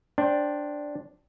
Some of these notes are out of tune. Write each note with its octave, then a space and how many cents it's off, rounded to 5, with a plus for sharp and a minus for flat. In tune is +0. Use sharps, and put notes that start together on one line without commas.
D4 +0 C5 +15 G5 +0